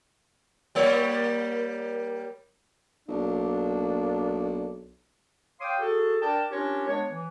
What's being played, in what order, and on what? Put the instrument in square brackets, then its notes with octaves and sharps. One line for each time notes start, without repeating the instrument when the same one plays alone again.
[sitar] G3 A#3 C#5
[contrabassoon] B1 [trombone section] A#3 D4
[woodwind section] C#5 F5 G5 C6 D6 D#6
F#4 G#4 A4
D4 A#4 D5 G5 A5
C#4 D4 F4 G4 A#4 C#5
G#3 B3 D4 C#5
E3